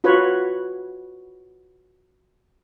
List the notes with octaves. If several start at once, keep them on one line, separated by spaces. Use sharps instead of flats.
F4 F#4 B4 C#5